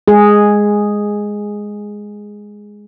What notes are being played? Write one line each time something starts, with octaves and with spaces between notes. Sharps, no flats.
G#3 G#4